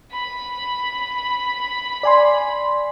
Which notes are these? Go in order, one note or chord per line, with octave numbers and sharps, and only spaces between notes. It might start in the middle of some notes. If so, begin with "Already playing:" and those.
B5
D5 G#5 C6